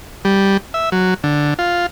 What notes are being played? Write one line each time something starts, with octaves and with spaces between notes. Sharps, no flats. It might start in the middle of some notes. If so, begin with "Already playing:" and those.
G3
E5
F#3
D3
F4